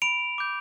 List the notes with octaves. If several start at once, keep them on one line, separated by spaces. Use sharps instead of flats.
B5 D7 F7
D6 G6